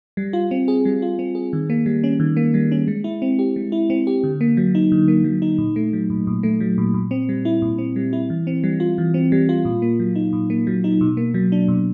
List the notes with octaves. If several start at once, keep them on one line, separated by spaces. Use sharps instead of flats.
G3
F4
C4
G#4
G3
F4
C4
G#4
D#3
A#3
G3
C#4
D#3
A#3
G3
C#4
G#3
E4
C4
G4
G#3
E4
C4
G4
D3
A#3
F#3
D#4
D3
A#3
F#3
D#4
A#2
A3
F#3
A#2
A#2
A3
F#3
A#2
A#2
C4
G3
E4
A#2
C4
G3
E4
E3
C4
G3
F4
E3
C4
G3
F4
A#2
A#3
F#3
D#4
A#2
A#3
F#3
D#4
B2
A#3
F#3
D4
B2